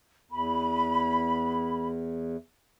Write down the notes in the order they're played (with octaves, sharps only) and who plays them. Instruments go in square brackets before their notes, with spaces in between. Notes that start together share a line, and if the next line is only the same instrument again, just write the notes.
[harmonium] E2 [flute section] B5